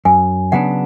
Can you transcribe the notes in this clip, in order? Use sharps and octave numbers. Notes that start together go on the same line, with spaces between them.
F#2 G#5
C#3 F#3 B3 D4 F#5